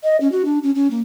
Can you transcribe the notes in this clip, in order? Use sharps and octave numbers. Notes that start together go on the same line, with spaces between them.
D#5
C#4
F#4
D4
C#4
C#4
A#3